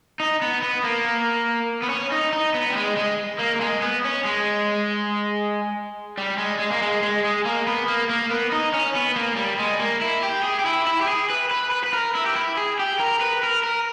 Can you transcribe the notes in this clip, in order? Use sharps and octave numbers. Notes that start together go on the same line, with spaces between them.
D#4
B3
B3
A#3
B3
C#4
D#4
D#4
B3
G3
G#3
G#3
A#3
A#3
G#3
B3
C#4
G#3
G3
G#3
G#3
A#3
G#3
G#3
G#3
A#3
B3
A#3
A#3
B3
D#4
C#4
B3
A#3
G3
G#3
A#3
E4
G4
G#4
G4
E4
E4
G4
G#4
B4
B4
B4
B4
A#4
E4
G4
E4
G#4
G4
A#4
B4
A#4
A#4